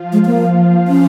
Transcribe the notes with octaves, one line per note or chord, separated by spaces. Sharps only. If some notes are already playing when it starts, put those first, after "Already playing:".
Already playing: F3 F4
G#3
A#3
F3 F4
C#4